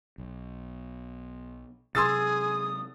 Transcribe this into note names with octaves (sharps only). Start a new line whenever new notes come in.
B1
C3 F#3 G#4 C6 D#6 E6 A6